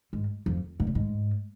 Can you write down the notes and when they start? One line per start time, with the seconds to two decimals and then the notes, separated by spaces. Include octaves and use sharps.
0.13 G#2
0.46 F2
0.80 G#2
0.87 A#2
0.95 G#2